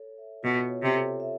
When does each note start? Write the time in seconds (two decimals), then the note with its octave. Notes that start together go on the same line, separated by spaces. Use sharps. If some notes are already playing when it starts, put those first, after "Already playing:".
Already playing: A4 C#5
0.18 E5
0.43 B2 F4
0.69 C#5
0.82 C3
0.95 A4
1.20 E5